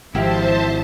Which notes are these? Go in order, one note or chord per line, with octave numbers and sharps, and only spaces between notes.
G#1 F3 E4 G4 C5 E5 F5 A5